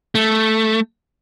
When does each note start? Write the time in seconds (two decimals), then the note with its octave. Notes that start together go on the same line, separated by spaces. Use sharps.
0.15 A3